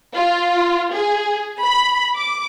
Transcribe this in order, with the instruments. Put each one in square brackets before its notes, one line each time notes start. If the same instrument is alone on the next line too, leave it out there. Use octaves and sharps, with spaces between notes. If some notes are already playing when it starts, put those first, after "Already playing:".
[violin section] F4
G#4
B5
D6